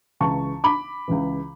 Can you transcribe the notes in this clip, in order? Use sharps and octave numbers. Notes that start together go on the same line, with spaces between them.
C#2 C#3 E3 A5 C#6
B5 D6
C#2 C#3 E3